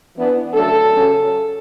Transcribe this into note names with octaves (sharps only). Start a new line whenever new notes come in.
E3 B3 D4
C#3 F#3 A3 D4 A4
C#3 F#3 C#4